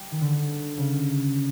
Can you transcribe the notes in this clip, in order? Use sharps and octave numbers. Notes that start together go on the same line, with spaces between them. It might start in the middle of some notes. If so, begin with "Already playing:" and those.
Already playing: G3
D#3
D3
C#3